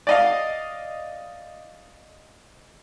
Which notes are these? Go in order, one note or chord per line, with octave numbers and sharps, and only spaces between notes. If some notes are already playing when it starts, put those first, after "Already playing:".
D5 D#5 F5